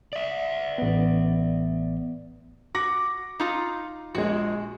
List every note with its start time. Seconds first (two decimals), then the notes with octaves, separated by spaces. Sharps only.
0.13 D5 E5
0.78 A1 B3
2.75 F#4 D6 A#6
3.40 D#4 F4 A#5
4.15 A#1 F3 G#3 F#4